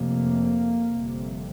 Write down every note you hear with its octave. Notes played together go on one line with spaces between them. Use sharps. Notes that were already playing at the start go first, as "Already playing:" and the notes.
Already playing: F1 F2 C3 A#3
G1 F2 C3